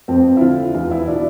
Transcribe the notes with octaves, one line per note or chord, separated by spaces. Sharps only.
F2 C4
E4
D3 F4
E2 F4
F4
E4
B2 D4